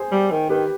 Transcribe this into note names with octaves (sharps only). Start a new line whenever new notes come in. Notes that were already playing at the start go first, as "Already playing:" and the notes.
Already playing: G#4 C5
G3
D#3
D#3 G4 B4